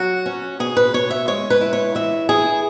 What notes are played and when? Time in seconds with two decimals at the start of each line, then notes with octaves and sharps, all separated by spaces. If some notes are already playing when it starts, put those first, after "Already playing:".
Already playing: F#3 F#4
0.26 C#4
0.60 B2 G#4
0.77 B4
0.94 B2 C#5
1.11 E5
1.28 G#3 C#5
1.50 B4
1.61 E4
1.73 C#5
1.95 E3 E5
2.29 E3 G#4